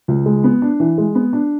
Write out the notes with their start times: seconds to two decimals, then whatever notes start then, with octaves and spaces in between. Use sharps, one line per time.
0.08 C#2
0.26 G#3
0.44 B3
0.62 D4
0.80 E3
0.98 G#3
1.15 B3
1.33 D4